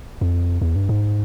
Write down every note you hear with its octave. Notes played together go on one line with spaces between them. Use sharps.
F2
E2
G2
G#2